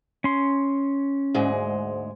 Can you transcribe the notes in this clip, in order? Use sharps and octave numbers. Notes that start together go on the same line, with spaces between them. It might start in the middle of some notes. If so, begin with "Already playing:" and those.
C#4 C6
D2 G#2 G#3